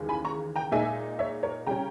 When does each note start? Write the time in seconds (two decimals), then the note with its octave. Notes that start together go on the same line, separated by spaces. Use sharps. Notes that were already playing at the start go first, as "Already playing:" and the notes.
Already playing: D#2 C#3 E3 G#3
0.09 G#5 B5
0.25 A#5 C#6
0.56 G5 A#5
0.71 A#2 G#3 D#4 E5 G#5
1.19 C#5 E5
1.43 A#4 C#5
1.66 C#3 G3 C#4 G5 A#5